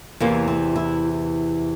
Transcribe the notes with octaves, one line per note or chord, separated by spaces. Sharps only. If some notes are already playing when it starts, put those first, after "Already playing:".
E2 C3 E3 A#3
C4
E4